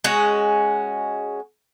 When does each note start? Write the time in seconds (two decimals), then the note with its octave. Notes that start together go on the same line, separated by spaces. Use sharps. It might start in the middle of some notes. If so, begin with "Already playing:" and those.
0.04 G#3 C#4 F#4